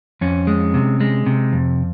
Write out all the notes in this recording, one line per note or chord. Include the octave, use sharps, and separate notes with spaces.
F2 C#4
G#3
C3
G#3
C3
F2